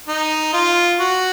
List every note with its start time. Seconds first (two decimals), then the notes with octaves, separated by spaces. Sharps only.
0.08 D#4
0.53 F4
1.00 F#4